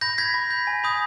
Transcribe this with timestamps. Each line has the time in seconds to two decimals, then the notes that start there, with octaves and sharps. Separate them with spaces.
0.01 B5 G6 A#6
0.18 G6 G#6 B6
0.34 B5
0.51 G6
0.67 G#5
0.84 B5 D#6 G6